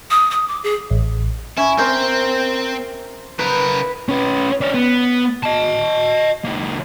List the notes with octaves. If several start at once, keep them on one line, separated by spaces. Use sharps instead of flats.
D#6
D#6
D6
G#4
A1
C#4 E4
C4 A#4 C5 E5
C#3 A#4 B4
C#4 B4
D4 C#5
B3
D#5 A5
C#2 A#3